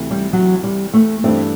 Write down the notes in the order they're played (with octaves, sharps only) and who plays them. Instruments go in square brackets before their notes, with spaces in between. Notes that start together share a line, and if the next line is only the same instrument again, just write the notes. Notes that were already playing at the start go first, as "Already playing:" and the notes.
Already playing: [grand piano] D2 C3 E3
[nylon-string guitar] G3
F#3
G3
A3
[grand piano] G2 E3 A3 D4 [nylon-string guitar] C4